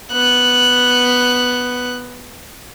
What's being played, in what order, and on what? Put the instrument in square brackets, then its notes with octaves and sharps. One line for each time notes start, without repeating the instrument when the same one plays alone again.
[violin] B3 F#6